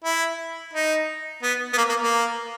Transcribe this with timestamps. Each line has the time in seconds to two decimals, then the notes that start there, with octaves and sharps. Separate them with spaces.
0.04 E4
0.73 D#4
1.43 B3
1.73 B3
1.77 A#3
1.89 A#3
2.00 A#3